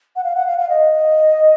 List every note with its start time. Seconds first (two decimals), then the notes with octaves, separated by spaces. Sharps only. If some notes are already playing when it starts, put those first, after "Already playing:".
0.16 F#5
0.24 F5
0.35 F#5
0.46 F5
0.58 F5
0.69 D#5